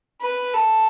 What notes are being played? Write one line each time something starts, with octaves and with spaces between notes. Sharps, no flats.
B4
A4